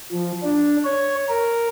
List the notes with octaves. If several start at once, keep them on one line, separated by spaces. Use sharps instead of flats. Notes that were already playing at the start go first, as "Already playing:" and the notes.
F3
D4
C#5
A#4